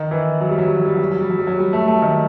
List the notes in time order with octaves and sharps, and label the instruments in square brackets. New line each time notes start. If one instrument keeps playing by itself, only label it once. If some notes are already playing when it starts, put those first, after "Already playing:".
Already playing: [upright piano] D#3
E3
F#3
G3
F#3
G3
F#3
G3
F#3
G3
F#3
G3
F#3
G3
F#3
G3
A3
A3
D#3